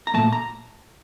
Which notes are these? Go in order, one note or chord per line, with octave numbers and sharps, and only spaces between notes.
A#5
A#2 F#3 A3 A5
A#5